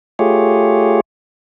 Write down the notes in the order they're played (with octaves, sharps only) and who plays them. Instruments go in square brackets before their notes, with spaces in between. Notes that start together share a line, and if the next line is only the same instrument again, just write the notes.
[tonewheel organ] A3 F4 G4 G#4 C#5